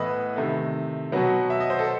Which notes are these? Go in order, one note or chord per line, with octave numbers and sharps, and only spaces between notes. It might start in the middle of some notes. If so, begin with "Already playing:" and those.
Already playing: A2 E3 B3 B4 D#5 E5
C3 D#3 A3
B2 F#3 B3
E5
D#5
C5
A4